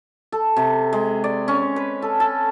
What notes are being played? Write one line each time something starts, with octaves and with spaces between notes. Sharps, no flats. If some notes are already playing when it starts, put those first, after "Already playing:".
A4
C3
G#3
D5
C#4
B4
A4
A4